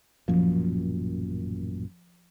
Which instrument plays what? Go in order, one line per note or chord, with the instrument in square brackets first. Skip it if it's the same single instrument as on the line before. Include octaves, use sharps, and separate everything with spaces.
[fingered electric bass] A1 F#2 A#2 [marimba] F3